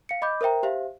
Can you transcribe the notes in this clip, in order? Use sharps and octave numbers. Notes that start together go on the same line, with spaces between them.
F5 C#7
D#5 B5 D6 G6
A#4 C5 E5 G5 A#5
G4 C5 E5 F5